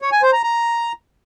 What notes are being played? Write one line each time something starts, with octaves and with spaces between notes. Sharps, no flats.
C#5
G#5
C5
A#5
A#5